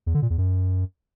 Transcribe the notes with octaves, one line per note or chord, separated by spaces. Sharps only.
E2
D3
A#2
E2
F#2